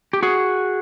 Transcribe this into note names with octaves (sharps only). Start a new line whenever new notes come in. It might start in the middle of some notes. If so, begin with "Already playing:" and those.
G4
F#4 G#4